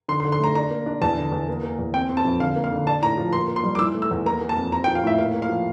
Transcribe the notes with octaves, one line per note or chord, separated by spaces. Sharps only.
D3 C6
C6
D3
C6
A3 A#5
D4 A#5
A#3
D4
E2 A5
D3
E2
A#3
A#3
E2
C4 G5
C4
A5
F2
D3 F5
A#3
F5
D3
D4 A5
A2 A#5
F3
A#3 C6
A#3
C6
G3
D6
E3 E6
A3
E6
E2
A#3 A#5
A#3
A5
F2
C4 A#5
G5
F3
F5
A2 E5
A#3 F5
A#3
F5
F3